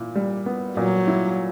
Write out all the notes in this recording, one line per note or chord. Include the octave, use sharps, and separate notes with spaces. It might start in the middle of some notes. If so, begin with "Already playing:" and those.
Already playing: A#2 E4
G3
B3
A#2 F#3
E4